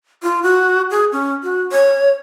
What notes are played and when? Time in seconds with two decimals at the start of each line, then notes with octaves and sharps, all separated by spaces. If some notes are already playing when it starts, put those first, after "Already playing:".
0.23 F4
0.43 F#4
0.90 G#4
1.12 C#4
1.43 F#4
1.72 C#5